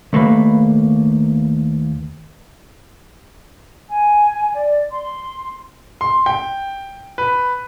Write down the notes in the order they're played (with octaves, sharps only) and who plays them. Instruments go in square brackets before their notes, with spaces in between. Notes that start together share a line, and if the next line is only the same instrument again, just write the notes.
[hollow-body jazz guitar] D#2 A3 A#3 B4
[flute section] G#5
D5
C6
[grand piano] C6
G5
B4